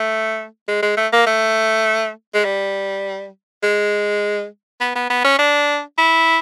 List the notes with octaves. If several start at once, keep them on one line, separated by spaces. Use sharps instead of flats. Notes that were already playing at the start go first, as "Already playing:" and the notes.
Already playing: A3
G#3
G#3
A3
A#3
A3
G#3
G3
G#3
B3
B3
B3
C#4
D4
E4